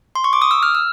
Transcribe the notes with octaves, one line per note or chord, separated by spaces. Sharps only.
C6
C#6
D6
D#6
E6
F6
E6